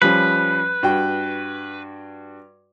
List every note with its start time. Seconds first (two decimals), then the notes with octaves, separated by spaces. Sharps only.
0.02 F3 G3 C#4 B4
0.83 G2 F#4 G5